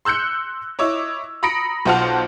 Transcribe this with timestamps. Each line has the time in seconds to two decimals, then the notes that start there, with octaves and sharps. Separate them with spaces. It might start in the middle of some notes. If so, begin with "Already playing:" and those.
0.05 C6 E6 F#6 G6 C#7
0.79 E4 C#5 D#5 D6 E6
1.43 A#5 B5 D#6 A#6 C#7 D7
1.85 B1 F4 C5 F#5 A5 F6